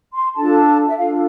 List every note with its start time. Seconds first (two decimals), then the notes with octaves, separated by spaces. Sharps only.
0.14 C6
0.35 D4 F4 A4 A5
0.88 E5
0.96 D4 F4 A4 F5